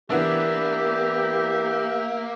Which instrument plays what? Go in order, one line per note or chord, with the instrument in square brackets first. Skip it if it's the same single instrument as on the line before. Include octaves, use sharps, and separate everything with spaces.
[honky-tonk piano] E3 B3 D4 [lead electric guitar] A#3 [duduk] G4 [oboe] E5